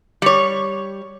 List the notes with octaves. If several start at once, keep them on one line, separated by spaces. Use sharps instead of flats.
G3 C#5